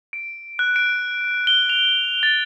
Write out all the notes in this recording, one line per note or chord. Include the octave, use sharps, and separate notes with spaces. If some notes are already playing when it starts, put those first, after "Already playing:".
D7
F#6
D7
G7
F7
A6